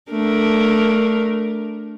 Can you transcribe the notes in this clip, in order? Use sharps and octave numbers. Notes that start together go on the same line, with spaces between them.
A3 D4 A#4